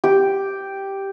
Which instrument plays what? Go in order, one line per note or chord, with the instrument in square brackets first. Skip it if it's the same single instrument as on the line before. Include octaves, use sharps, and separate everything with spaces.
[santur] G4